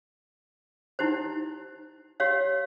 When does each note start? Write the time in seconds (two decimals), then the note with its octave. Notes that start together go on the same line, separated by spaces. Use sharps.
0.99 D#4 E4 G4 C5
2.20 G4 C#5 F5